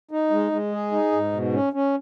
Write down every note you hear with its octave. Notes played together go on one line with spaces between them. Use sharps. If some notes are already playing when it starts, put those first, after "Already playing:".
D#4
G#3
G#3
G#4
D#4
G#2
B2
C#4
C#4